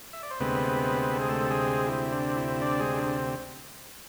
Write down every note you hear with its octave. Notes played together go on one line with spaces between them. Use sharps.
E5
D5
C5
D2 C3 G#3 B3 C4 B4
A4
G#4
A3 A4
G#3 G#4
E4
D4
E4
D4 D5
G#3 G#4
D4